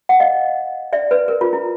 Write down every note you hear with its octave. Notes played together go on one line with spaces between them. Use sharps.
F#5
D#5 F5
D5 E5
B4
A#4
F4
E4